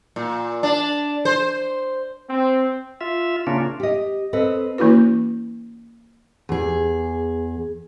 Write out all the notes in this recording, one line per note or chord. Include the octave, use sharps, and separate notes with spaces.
A#2
D4
C5
C4
F4 E5
C#3 A#3 C#4 D4 F4
G4 D#5
C4 A4 B4 D#5
E3 A#3 C#4 E4 F#4 B4
E2 G#4